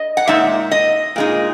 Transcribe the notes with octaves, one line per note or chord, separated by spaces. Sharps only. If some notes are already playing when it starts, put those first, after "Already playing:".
Already playing: D#5
F#5
A#2 G#3 D#4 E5
D#5
A#2 G#3 D#4